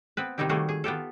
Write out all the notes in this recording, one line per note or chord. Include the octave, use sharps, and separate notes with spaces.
B3 C4 B4
C3 D#3 G3 D#4 E4 G4
D#3 G3 A3 A#3 F#4 G#4
G#4
B3 F4 G4 A4